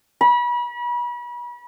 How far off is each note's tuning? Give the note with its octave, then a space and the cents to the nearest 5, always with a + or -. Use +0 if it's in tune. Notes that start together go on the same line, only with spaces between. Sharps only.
B5 -35